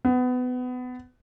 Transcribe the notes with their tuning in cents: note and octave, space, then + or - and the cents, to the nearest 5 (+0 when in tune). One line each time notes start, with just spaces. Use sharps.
B3 +25